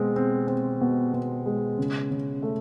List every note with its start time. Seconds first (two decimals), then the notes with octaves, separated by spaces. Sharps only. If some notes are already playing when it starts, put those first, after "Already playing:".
Already playing: B2 G#3 C4
0.16 C4
0.48 C4
0.81 B2
1.13 B2
1.46 G#3
1.78 C#3
2.11 C#3
2.43 A3